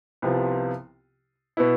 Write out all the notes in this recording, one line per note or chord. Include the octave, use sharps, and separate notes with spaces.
C2 C3 F3 B3 F4
B2 B3 E4